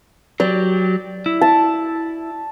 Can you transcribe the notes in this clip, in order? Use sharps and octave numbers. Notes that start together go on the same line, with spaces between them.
F#3 G4 D5
E4
A5